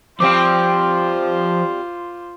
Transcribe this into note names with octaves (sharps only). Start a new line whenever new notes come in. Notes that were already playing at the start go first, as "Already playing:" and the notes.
F3 G3 C4 F4 G4 C5 F5 D6